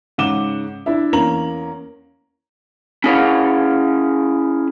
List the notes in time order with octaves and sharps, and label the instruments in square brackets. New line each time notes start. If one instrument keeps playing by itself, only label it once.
[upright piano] G#2 C#3 F#5 D6 E7 G7
D4 E4 E5
E2 A#3 C#4 A#5 F#7
[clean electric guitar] C#4 E4 G#4 C#5 F5 F#5